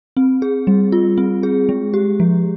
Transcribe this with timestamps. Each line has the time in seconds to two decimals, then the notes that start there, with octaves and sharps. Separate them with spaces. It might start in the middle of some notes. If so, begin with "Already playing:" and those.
0.17 C4
0.42 G#4
0.67 G3
0.92 F4
1.18 C4
1.43 G#4
1.69 G#3
1.94 G4
2.20 F3